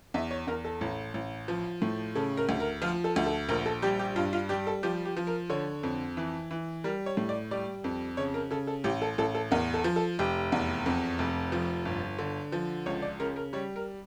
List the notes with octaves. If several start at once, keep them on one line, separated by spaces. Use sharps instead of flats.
E2 E5
C#5
E2 A#4
A4
A1
A1
F3
A2
C#3 A4
A#4
D2
A#4
F3 F4
A4
D2
A4
A#1 A#4
A4
G3 G4
G4
G2 F4
F4
G3 G4
A4
F3 G4
G4
F3
A#4
D3 C#5
F2
E3
E3
G3 A#4
C#5
A2
D5
G3 D5
F2
C#3 C#5
A#4
C#3 A4
A4
A1 G4
A4
A1 A4
A4
E2 A#4
A4
F3
A4
F1 G4
E2
F2
F1
F3
G1
D3
F3
C#2 C#5
D5
C#3 A#4
A#4
G3 C#5
A#4